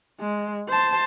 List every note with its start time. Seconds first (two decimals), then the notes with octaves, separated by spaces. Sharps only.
0.20 G#3
0.68 C5 A5